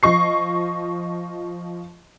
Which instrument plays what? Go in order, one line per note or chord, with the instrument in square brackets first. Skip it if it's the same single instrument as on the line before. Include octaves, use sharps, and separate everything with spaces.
[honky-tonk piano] F3 D#5 C#6 C7